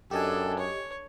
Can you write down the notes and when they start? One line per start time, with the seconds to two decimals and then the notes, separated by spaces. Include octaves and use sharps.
0.11 F#2 D4 G4 A4 D#5 G#5
0.59 C#5